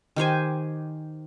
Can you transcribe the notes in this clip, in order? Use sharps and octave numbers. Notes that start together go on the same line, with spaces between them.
D#3 G4 C5 G#5